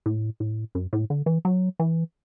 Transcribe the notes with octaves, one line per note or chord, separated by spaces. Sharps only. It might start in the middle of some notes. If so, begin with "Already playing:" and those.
A2
A2
F#2
A2
D3
E3
F#3
E3